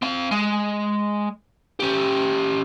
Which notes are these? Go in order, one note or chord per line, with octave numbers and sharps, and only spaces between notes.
C4 F5
G#3
C#4 G4